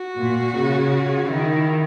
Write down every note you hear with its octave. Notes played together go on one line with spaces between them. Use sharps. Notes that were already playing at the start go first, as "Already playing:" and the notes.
Already playing: F#4
A#2
C#3
D#3 E4